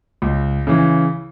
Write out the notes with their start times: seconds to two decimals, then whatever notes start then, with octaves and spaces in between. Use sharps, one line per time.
0.22 C#2
0.67 C#3 E3